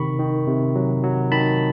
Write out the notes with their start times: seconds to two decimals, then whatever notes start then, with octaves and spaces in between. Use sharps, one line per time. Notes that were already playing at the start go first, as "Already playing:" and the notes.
Already playing: C3 D#3 B5 C#6
0.19 D#3
0.47 C3
0.75 F#3
1.03 F#3
1.32 D#3 A5 B5